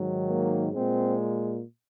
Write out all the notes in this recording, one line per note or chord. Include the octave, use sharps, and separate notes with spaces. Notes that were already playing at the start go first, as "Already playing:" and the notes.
Already playing: G#2 D#3 F#3
A#3
A#2 G#3 C4